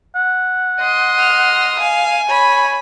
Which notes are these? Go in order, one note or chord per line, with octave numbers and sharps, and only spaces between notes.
F#5
D#5 C6
F6
F5 G#5
C#5 B5